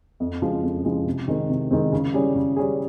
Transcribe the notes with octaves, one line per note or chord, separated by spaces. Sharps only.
F2
C#3 F3 G#3
F2
C#3 F3 G#3
C3
D#3 G#3 C4
C3
D#3 G#3 C4
C#3
G3 C#4 G#4
C#3
G3 C#4 G#4